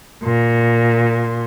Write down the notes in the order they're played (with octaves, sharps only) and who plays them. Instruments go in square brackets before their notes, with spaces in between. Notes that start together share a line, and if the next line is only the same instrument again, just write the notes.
[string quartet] A#2